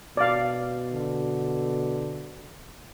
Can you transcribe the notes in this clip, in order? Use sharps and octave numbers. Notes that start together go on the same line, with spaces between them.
B2 D5 F5
D3